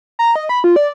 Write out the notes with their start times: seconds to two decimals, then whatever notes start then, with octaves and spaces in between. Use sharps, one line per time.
0.19 A#5
0.36 D#5
0.49 B5
0.64 F4
0.76 D5